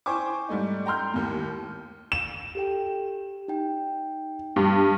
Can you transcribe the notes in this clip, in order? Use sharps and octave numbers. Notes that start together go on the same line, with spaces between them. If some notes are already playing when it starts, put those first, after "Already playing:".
E4 C5 G5 G#5 C#6 D6
G#2 G3 A3 D#4
G5 A#5 C6 F6 G6
D#2 A2
E7
G4 A4 G5
G4
D#4 G5
G2